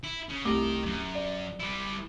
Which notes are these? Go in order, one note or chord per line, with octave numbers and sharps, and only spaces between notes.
E4
C#3
C2 A3 A#4 D#5 D6
F#2
D5
G3 E4